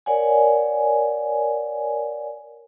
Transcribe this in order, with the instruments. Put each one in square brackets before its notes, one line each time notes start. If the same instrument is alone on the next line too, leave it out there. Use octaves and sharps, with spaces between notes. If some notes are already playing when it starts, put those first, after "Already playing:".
[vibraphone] A#4 C#5 D5 F#5 G#5